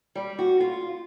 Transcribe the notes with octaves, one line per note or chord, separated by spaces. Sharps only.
G3
F#4
F4